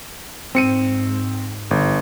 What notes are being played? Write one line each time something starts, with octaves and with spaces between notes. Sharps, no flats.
G#2 C4 C#7 D#7
G1